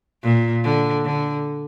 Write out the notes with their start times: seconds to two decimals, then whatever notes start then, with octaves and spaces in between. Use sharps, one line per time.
0.23 A#2
0.64 D3
1.05 D3